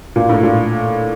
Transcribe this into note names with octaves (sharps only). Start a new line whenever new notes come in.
A#2
A2
A#2